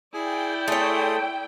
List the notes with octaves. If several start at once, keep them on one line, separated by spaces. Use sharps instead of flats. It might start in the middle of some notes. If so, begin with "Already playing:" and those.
E4 G#4 D5 G5 G#5
A3 G#4 C#5 C6 D#6